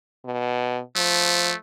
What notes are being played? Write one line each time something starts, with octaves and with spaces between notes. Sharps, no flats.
B2
F3 A3